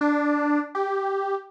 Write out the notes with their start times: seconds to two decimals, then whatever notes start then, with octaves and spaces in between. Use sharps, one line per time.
0.01 D4
0.75 G4